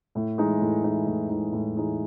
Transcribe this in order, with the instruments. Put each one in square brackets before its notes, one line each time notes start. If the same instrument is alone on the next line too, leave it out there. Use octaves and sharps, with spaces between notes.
[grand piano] A2
E3 G#3 D#4
A2
E3 G#3 D#4
A2
E3 G#3 D#4
A2
E3 G#3 D#4